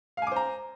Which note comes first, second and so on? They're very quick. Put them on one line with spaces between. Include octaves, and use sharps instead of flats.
F5 G#5 D6 C5 A#5